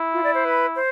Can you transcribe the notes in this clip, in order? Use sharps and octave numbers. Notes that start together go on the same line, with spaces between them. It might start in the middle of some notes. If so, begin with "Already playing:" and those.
Already playing: E4
F4
D5
C5
B4
C5